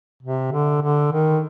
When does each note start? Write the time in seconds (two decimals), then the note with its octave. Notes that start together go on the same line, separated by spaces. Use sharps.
0.23 C3
0.52 D3
0.82 D3
1.13 D#3